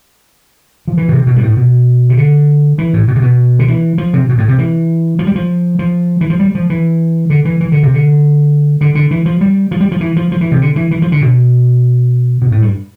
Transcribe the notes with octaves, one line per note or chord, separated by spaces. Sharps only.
F3
E3
B2
C3
B2
G2
A2
B2
C3
D3
E3
A2
B2
C3
B2
D3
E3
F3
C3
B2
A2
C3
E3
F3
G3
F3
F3
E3
F3
G3
F3
E3
D3
E3
E3
D3
C3
D3
D3
D3
E3
F3
G3
F3
G3
F3
E3
F3
F3
E3
C3
D3
E3
E3
F3
D3
B2
B2
A2
G2